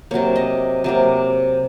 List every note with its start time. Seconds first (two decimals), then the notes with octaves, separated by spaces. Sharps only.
0.11 C3 F#3 A#3 C#5
0.36 D#5
0.84 C3 F#3 A#3